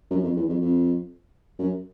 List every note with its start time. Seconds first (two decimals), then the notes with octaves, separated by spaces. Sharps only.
0.10 F#2
0.23 F2
0.35 E2
0.49 F2
0.61 F2
1.59 F#2